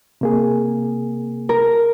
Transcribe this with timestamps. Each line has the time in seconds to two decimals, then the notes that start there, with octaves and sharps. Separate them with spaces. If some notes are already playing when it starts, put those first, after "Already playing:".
0.21 C3 A#3 G#4
1.49 A#4